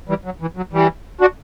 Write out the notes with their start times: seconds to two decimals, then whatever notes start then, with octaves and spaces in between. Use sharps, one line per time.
0.09 E3 G3
0.25 F#3
0.41 E3
0.57 F#3
0.73 E3 G3
1.21 D4 F#4